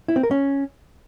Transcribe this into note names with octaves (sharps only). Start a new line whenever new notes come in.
E4
C4
A#4
C#4